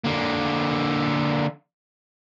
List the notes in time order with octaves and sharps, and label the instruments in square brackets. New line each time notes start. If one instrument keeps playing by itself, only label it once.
[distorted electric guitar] D3 A#3